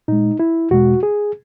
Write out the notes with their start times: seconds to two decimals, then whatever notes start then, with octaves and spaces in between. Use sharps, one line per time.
0.08 A#2 G#3 D#4
0.40 E4
0.71 E2 B2 G#3 F#4
1.03 G#4